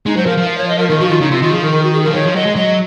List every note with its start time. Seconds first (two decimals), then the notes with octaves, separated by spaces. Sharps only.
0.06 G#3 D#4
0.16 F#3 C5
0.26 F3 A#4
0.37 F3
0.47 F5
0.58 C#5
0.68 D#5
0.78 A#4
0.89 D#3 A#4
1.00 F3 F#4
1.09 D#3 F4
1.21 C#3 D#4
1.31 C3 F4
1.42 D#3 F4
1.52 F3 G#4
1.62 D#3 A#4
1.72 A#4
1.83 F#4
1.93 G#4
2.04 F3 A#4
2.14 D#3 C#5
2.25 F3
2.35 F#3 D#5
2.46 G#3
2.56 F#3 D#5